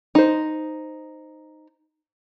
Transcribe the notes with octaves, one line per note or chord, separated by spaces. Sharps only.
D#4 C5